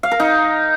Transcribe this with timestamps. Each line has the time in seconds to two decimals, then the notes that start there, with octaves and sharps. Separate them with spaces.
0.03 F5
0.11 A#4
0.20 D#4